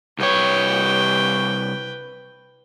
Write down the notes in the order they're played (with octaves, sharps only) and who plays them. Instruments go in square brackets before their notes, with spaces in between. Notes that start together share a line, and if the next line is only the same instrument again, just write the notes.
[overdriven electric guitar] C2 C#5 [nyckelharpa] B4 G5